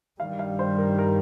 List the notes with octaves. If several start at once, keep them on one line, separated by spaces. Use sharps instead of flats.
G2 D#3 G3 F5
F5
C5
A#4
A#4